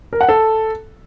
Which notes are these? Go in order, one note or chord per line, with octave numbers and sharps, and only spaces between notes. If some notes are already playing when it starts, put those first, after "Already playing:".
A#4
F#5
A4